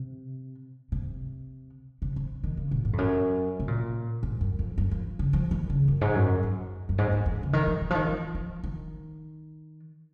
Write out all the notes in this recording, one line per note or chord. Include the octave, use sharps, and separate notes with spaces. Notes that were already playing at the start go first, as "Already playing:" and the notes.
Already playing: C3
C3
C3
C3
D#3
C#3
A#2
G#2
F2
F#2
C3
A#2
G#2
F#2
F2
F#2
F3
C#3
F3
D#3
C#3
F#2
G#2
F#2
F#2
F#2
G#2
F#2
F2
C#3
D#3
F3
D#3
F3
D#3
F3
F3
D#3